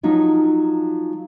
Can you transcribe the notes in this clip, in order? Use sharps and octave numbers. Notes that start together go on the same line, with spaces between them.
F3 F#3 D#4